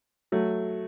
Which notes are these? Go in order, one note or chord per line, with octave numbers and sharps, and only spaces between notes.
F#3 A3